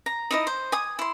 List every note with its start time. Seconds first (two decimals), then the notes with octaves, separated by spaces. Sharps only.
0.06 A#5
0.31 D#4 E4 D#5
0.47 C5
0.72 G#5 D#6
0.99 E4 C6